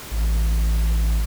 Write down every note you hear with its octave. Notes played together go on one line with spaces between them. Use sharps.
A1